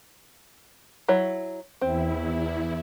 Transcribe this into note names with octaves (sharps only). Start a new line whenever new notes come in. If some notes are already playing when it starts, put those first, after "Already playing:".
F#3 E4 C#5
E2 C4 E4